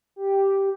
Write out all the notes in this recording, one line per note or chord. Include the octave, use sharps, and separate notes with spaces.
G4